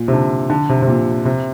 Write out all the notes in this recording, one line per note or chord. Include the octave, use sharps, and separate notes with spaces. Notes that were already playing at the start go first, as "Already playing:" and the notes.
Already playing: A#2
C3
D3
D3
C3
C3
A#2
C3